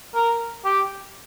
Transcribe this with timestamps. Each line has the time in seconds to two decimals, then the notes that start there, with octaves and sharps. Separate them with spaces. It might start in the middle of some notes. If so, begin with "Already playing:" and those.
0.15 A#4
0.65 G4